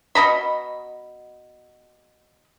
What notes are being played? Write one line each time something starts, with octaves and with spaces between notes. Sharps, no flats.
B2 D#5 A#5 B5